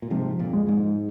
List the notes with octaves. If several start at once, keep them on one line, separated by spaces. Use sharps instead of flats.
A#2
G#2 C3 F3
F2 A#2
G#3
G#2